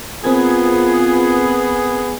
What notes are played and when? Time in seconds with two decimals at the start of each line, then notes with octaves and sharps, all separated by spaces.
0.24 B3 C4 F4 G#4 A#4 G#6